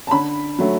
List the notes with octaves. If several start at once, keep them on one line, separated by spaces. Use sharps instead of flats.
A5
D3 B5
F#3 A3